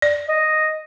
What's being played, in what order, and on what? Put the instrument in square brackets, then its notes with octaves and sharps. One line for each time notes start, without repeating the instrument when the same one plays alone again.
[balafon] D5
[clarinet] D#5